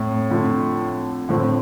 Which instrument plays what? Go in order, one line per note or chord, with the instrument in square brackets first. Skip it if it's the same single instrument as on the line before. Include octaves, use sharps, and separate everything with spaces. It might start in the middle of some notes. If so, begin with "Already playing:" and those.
Already playing: [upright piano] F2 [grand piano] A2
[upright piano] F2 D3 F3 A3
[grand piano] A2 [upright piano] D3 F3 C4